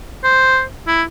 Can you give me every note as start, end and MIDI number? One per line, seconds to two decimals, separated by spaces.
0.24 0.63 72
0.87 1.03 64